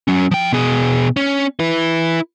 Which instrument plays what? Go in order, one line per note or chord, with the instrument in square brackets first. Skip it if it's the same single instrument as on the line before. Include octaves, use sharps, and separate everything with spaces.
[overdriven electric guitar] F#3 C#4
F3 G5
B2 G#4
C#4
E4 B4